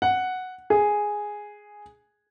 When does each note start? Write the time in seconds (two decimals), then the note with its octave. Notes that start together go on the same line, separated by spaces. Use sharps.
0.02 F#5
0.70 G#4